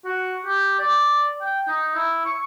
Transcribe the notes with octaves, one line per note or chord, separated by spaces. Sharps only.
F#4
G4
D5
G5
D#4
E4
C#6